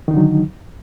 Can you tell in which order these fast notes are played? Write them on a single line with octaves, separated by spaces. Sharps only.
D#3 D#4 D3 F#3